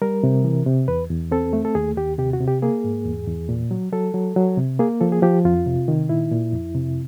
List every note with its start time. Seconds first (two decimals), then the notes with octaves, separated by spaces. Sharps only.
0.02 G3 A#4
0.24 C3
0.44 E3
0.66 C3
0.88 E2 B4
1.10 E2
1.32 C4 A4
1.53 A3
1.65 A4
1.75 D#2 G#4
1.97 D#2 G4
2.18 C3 G4
2.33 F#4
2.40 C3
2.48 G4
2.62 A#3 G#4
2.84 G#2
3.06 E2
3.28 E2
3.49 A#2
3.71 F#3
3.92 F#3 A4
4.14 F#3
4.36 F#3
4.57 C3
4.79 A#3 G#4
5.01 F3 A4
5.12 G#4
5.22 F3 G4
5.45 F2 F4
5.67 C3
5.88 D#3
6.09 A#2 E4
6.31 A#2
6.53 F2
6.75 C3